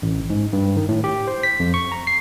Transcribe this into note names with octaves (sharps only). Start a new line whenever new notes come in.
A1
G#2
G2
D#3
A2
G4
C5
B6
F2
C#6
A#5
C7